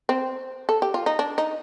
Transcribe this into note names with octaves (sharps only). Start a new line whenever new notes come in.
C4
A4
G4
F4
D#4
D4
D#4